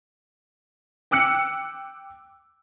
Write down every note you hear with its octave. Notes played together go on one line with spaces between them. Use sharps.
G5 D6 E6 F#6 C#7